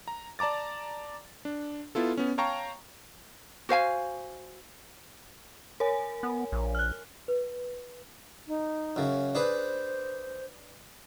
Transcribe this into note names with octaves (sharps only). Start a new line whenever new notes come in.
A#5
D5 A5 A#5 D6 A6
D4
B3 E4 F4 A4
B3 C#4
C#5 F5 G5 A5 A#5 C#6
F#4 C5 F5 G#5
A#4 C#5 G#5
B3
A#1
F6 F#6
B4
D#4
F#2 C#3
D4 G#4 B4 C5